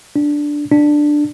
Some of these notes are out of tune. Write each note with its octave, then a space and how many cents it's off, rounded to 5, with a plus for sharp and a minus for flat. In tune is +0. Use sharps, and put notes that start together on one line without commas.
D4 +0
D4 +10